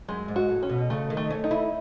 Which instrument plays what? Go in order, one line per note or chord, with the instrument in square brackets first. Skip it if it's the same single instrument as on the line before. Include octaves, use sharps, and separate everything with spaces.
[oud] F#2 [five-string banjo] G#3
[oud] G#2
[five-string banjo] F#4
[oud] A2
[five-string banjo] C#4
[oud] B2
[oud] C#3 [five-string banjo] A3
[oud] D#3
[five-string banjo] A3
[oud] C#4
[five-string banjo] D#4
[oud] E4